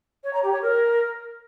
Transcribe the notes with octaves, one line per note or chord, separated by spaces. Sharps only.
C#5
A#5
G4
C#5
A#4